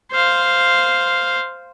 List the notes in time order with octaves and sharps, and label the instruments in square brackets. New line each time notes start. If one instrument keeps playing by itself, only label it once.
[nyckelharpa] C5 F5